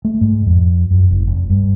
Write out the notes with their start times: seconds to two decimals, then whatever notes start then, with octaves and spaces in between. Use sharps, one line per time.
0.05 A3
0.21 G#2
0.46 F2
0.91 F#2
1.11 F#1
1.27 F1
1.50 G2